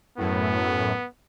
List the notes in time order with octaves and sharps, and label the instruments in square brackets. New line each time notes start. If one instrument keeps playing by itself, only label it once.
[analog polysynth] F#2 A2 [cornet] B3